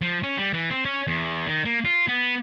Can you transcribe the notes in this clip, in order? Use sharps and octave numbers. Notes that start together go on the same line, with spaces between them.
F3
C#4
G3
E3
C4
C#4
E2
D#3
A#3
F4
B3